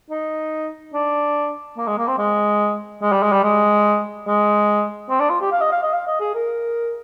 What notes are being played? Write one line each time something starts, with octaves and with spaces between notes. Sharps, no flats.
D#4
D4
A#3
G#3
A#3
C4
G#3
G#3
G3
G#3
G3
G#3
G#3
C4
D4
F4
G4
F5
D#5
F5
D#5
F5
D#5
G#4
A#4